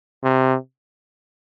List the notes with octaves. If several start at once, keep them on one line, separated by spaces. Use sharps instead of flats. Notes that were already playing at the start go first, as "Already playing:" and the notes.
C3